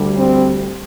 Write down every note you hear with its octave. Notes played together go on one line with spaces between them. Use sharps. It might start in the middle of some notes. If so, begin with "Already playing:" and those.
Already playing: D2 D3 G3
C4